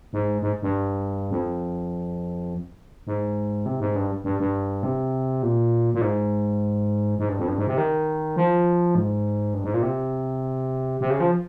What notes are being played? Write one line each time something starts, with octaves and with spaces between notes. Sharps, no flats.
G#2
G#2
G2
F2
G#2
C3
G#2
G2
G2
G2
C3
A#2
A#2
G#2
G#2
G2
F2
G2
G#2
C3
D#3
F3
G#2
G2
G#2
A#2
C3
C3
C#3
F3